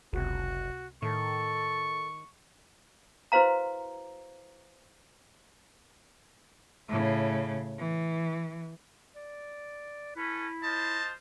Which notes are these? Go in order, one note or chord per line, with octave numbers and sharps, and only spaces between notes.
F#1 C#2 C3 F#4
A2 D#3 A4 C#6
E4 F#4 B4 C5 F5 A#5
A2 C#3
E3
D5
C#4 E4 A4 B4
F4 C5 D#5 A5